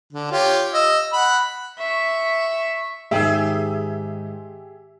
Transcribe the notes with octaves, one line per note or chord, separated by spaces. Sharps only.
D3
F4 G4 C#5
D#5 E6
F#5 B5
E5 C#6
G#2 D#3 G4 G#4 E5 E6